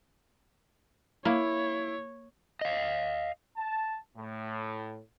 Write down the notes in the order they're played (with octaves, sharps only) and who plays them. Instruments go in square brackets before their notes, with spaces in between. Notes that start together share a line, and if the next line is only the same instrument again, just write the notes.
[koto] A#3 [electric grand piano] E4 [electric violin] C#5
[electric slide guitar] D#5 F5
[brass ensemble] A5
A2